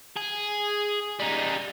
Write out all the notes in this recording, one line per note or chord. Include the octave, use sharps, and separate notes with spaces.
G#4
G3 D#4